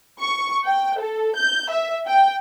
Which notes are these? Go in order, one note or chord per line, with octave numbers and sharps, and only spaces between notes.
C#6
G5
A4
G6
E5
G5